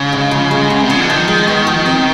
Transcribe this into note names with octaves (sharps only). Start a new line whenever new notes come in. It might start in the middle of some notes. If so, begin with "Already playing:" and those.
Already playing: C#3 G#3
D3
F3
G#3
B3
C3
C#3 F3
D3
D#3 F3
G#3
B3
F3
C4